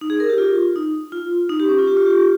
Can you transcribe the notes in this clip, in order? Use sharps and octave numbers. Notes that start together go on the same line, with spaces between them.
D#4
G#4
A#4
G4
F4
D#4
F4
D#4
G4
C#4
F4
G4
F4
G4